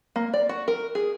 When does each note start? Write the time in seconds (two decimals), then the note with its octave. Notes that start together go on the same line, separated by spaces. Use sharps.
0.16 A#3
0.34 D5
0.49 F#4
0.68 A#4
0.95 G#4